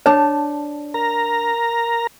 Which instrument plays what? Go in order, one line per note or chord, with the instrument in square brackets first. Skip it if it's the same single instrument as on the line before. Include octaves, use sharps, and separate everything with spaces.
[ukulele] D4 A5 [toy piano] C#5
[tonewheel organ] A#4 A#5